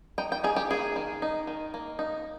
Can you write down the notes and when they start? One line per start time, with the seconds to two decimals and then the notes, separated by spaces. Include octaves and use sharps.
0.18 D#4 G5
0.32 G5
0.44 D#4 G#4
0.56 G4
0.70 A#3 G#4
0.96 D#3
1.22 D#4
1.47 D#3
1.74 A#3
1.99 D#4